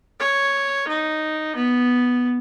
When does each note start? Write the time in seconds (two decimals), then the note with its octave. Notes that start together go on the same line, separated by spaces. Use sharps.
0.20 C#5
0.88 D#4
1.56 B3